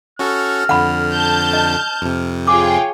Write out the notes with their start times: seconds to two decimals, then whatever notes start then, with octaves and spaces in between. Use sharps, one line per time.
0.19 C#4 F#4 A4 F6
0.69 F2 D3 F#5 B5
1.14 A5 G6
1.53 D#5
2.02 F2 C3
2.47 F4 G#4 C#5 G5 D6